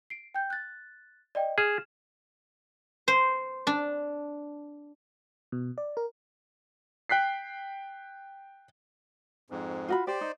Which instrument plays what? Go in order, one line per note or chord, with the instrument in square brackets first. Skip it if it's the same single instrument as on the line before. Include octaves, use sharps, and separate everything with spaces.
[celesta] C7 D7
G5 G6
F#6 A6
D5 D#5 G5
[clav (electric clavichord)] G#4 [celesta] F6 E7
[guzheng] C5
D4
[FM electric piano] B2
D5
A#4
[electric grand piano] G5 F#6 B6 C7
[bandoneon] F2 G#2
[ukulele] F4 F#4 B5
[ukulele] G4 [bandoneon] C5 D5
[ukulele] D#4